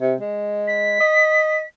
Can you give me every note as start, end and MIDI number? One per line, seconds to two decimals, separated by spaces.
0.01 0.15 48
0.20 0.96 56
0.67 1.66 95
1.00 1.61 75